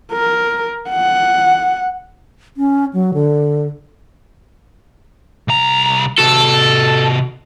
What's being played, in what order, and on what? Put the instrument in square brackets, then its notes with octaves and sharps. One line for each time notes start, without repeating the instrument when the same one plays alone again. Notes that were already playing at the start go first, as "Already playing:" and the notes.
[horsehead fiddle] A#4
F#5
[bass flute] C#4
F#3
D3
[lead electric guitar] C2 A#5
[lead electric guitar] C3 F#4 [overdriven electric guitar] A4